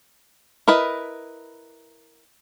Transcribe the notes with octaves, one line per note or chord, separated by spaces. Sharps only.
E4 A#4 B4 D#5